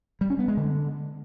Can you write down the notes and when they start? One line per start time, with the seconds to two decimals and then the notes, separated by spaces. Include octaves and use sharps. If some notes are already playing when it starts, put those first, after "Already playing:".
0.21 G3
0.30 C#4
0.39 B3
0.48 G#3
0.57 D3